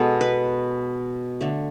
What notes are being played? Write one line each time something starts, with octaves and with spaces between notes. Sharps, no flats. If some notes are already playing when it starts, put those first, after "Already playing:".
Already playing: B2 G#3 B3 A4
B4
D3 A3